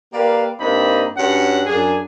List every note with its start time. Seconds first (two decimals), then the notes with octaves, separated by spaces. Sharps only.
0.13 A#3 G4 A#4 B4 D5 F5
0.60 G2 A#3 C4 D4 D#4 B5
1.16 G2 C#4 F#4 F#5
1.66 F#2 D4 G#4